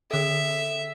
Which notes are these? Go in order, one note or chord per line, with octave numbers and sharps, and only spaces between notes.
D3 A4 E5